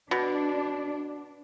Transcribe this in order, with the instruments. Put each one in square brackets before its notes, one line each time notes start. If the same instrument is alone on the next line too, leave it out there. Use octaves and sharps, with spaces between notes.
[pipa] B2 [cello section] D4